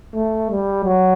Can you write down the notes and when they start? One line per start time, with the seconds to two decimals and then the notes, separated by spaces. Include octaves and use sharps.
0.15 A3
0.51 G3
0.85 F#3